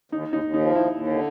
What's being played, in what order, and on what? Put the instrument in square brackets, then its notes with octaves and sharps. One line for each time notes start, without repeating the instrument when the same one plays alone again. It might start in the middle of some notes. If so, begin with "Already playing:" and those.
[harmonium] D#2 [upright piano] D#4
[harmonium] D#2 [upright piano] D#4
[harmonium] D#2
[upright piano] D#4
[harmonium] F3
[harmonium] D#2 [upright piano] E4
[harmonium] D#2
D3